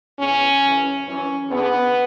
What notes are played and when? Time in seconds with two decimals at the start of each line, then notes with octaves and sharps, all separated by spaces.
0.19 E2 C#3 E3 C#4
0.63 F#2 C#3 E3
1.06 F#2 E3 C#4
1.50 E2 D3 B3